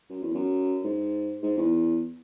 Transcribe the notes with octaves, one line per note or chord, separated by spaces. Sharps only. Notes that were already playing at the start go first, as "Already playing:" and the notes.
F#2
E2
F#2
G#2
G#2
E2